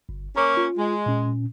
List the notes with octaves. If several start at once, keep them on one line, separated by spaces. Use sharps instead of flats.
G1
A#3 C#4 A#5 D6
F4
G#3
A#2 C#4